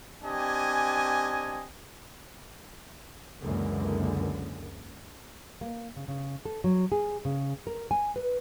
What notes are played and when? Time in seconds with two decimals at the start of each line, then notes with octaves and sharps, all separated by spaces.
0.24 C4 D4 G4 D#5 G#5
3.41 C#2 F#2 D3 E3 G#3 A#3
5.61 A#3
5.96 C#3
6.08 C#3
6.45 A4
6.64 F#3
6.92 G#4
7.25 C#3
7.67 A#4
7.91 G#5
8.16 B4